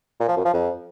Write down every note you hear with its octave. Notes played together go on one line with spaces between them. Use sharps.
A#2
F3
F#2
F3
F2